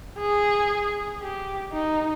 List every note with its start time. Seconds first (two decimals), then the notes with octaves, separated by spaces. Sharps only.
0.19 G#4
1.22 G4
1.73 D#4